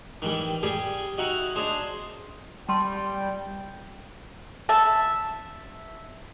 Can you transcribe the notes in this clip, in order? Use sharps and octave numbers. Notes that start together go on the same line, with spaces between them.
D#3 E3 G3
G3 G4 G#4
D#4 E4 F#4 D#5
D4 D#4 G#4 C5
G3 G5 A5 C6
E5 A5